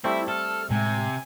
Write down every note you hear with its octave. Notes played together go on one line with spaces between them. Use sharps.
G3 A3 C4 E4
A4 F6
A2 C3 G#3 G#5